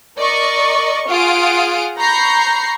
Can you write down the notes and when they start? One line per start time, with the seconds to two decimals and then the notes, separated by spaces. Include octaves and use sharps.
0.19 A#4 D5 D#5 C#6
1.10 F4 G#4 F#5 D#6 F6 D7
1.99 A#5 B5 C#6 G6 A#6 C7